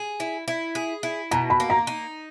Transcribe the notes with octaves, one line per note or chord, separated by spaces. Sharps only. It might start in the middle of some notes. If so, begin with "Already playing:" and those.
Already playing: G#4
E4
E4
G#4
E4
B2 A#5
B5
A#3
A#5
D#4